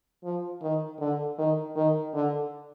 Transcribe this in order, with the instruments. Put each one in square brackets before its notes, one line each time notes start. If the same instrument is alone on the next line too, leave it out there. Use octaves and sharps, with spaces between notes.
[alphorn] F3
D#3
D3
D#3
D#3
D3